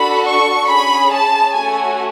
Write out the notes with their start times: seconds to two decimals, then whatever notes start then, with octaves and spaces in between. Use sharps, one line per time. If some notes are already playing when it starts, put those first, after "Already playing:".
Already playing: D4 F#4 A4 B5
0.27 C#6
0.70 C#4 G#4 B5
1.12 A5
1.55 A3 C#4 F#4 G#5